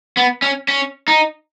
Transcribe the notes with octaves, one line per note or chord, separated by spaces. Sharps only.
B3
C#4
C#4
D#4